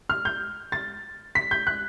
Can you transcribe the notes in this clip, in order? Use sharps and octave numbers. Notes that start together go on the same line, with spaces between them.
F6
G6
A6
B6
G6
F#6